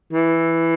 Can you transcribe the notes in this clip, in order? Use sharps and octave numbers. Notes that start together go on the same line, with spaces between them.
E3